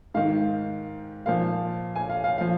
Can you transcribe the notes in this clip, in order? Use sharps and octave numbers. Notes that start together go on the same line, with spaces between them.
G#2 D#3 F5
A#2 F3 F5
G#5
F5
F5
F3 F5